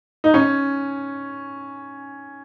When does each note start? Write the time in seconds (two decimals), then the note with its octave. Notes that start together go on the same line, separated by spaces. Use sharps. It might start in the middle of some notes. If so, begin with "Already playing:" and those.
0.24 D#4
0.34 C#4